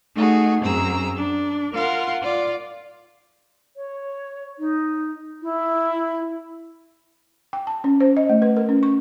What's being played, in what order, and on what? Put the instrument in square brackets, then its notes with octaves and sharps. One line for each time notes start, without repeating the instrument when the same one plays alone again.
[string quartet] A3 D#4 F#4 G#4
F#2 C4 G#4 A#5 E6
D4
F4 A#4 F5 F#5 C6
F4 D5
[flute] C#5
D#4
E4
[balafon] G5
A5
C#4
C5
D#5
A3
B4
A#4
C#4
C#6